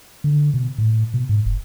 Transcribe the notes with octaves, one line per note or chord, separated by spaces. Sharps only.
D3
B2
A2
B2
G#2
F1